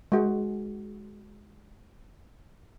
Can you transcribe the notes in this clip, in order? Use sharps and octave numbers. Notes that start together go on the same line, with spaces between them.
G#3 F#4